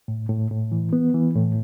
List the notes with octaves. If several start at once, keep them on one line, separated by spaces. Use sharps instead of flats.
A2
A2
A2
E3
B3
E3
A2